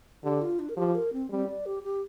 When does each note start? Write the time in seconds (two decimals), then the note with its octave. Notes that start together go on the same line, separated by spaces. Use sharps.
0.24 D3 G4
0.42 F4
0.59 D4
0.69 A#4
0.77 F3 G4
0.95 A#4
1.13 C4
1.30 G3 C4
1.47 D5
1.66 G4
1.83 G4